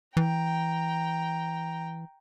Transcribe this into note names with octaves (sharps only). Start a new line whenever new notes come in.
E3 G5 A#5